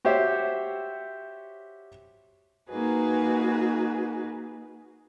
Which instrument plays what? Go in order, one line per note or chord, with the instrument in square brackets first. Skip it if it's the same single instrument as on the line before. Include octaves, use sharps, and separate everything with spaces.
[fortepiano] F#4 G4 C5 C#5 E5
[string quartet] A#3 D#4 F#4 G#4 B4